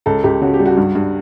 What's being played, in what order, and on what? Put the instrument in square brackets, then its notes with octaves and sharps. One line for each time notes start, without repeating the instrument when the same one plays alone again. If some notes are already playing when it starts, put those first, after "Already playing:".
[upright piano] C#2 A4
C#2 G4
C#3 F#4
G4
G3
F#4
G2
G2